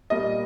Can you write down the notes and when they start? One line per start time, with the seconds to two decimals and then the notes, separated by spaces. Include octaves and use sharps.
0.10 A#2 G3 A#3 D#5